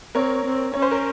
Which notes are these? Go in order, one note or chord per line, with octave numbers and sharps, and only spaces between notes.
C4 A#4 C#5
C4
C#4 C#5
C5
A#4